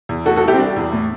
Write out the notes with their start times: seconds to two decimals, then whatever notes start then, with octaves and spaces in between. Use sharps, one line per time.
0.09 E2
0.26 A3 F#4 A4
0.36 F#4 A4
0.42 C2
0.48 E4 G4
0.53 C4
0.59 G3 D4
0.76 E2
0.93 A2